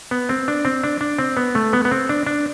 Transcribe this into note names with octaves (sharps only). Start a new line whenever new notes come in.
B3
C4
D4
C4
D4
D4
C4
B3
A3
B3
B3
C4
D4
D4